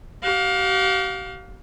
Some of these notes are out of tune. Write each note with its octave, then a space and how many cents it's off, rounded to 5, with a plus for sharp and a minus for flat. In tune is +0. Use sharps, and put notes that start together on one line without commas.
G4 -40 F5 +25